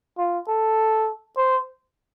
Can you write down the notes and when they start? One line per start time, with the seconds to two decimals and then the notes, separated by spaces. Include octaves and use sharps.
0.18 F4
0.48 A4
1.37 C5